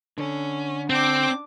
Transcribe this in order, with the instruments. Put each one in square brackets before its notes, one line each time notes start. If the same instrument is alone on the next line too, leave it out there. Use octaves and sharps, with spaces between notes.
[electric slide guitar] D3 [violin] C#4
[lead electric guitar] C4 [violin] D4 D6 [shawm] G5